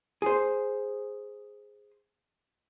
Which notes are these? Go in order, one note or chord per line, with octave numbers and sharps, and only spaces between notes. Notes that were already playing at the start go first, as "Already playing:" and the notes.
G#4 C5